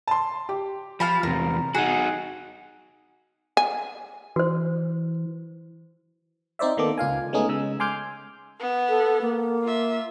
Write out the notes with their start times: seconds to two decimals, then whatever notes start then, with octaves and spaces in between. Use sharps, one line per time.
0.07 A5 C6
0.49 G4
1.00 F3 F5 A5 B5
1.23 E2 C3 A#4
1.74 D#4 F#4 G#4 F#5
3.57 G#5
4.36 E3 F#4 C5
6.59 C4 D#4 C5 D5 E5
6.77 D#3 A#3 B3 A4 D6
6.98 C#2 F4 F5 G#5
7.33 G#3 A3 B3 C#4 D#4 G#4
7.49 C#3 G#3 E6
7.80 G#5 C6 D6 F6 G6
8.60 B3
8.89 A4
9.21 A#3
9.64 F4 E5